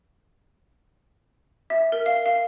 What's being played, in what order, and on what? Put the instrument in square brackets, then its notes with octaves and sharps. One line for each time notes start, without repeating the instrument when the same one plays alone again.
[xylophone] E5
A#4
F5
F5